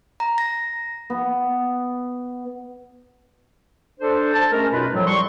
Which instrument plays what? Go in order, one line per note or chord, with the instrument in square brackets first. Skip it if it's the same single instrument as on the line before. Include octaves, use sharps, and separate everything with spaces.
[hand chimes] A#5
A#6
[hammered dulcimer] B3
[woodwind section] D4 A4 C5
A5
G#3 A3 C#4 A#4
F#2 B2 D#4 F4 B4 B5
A2 F3 F#3
G3 C6 C#6